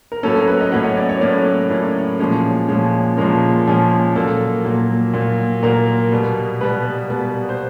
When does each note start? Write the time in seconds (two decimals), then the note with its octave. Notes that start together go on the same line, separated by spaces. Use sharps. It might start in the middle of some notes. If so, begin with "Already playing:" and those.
0.12 A#4
0.23 A2 F#3 A#3 C#4 A4
0.35 A#4
0.48 B4
0.60 D#5
0.72 A2 F#3 A#3 C#4 F#5
0.84 C#5
0.97 D5
1.09 C#5
1.21 A2 F#3 A#3 C#4 D5
1.70 A2 F#3 A#3 C#4
2.19 A#2 F3 G#3 C#4
2.68 A#2 F3 G#3 C#4
3.17 A#2 F3 G#3 C#4 A#4
3.67 A#2 F3 G#3 C#4
4.15 A#2 F#3 A#3 A4
4.64 A#2 F#3 A#3
5.14 A#2 F#3 A#3
5.63 A#2 F#3 A#3 A#4
6.12 B2 G3 B3
6.61 B2 G3 B3 B4
7.10 B2 G3 B3
7.49 C5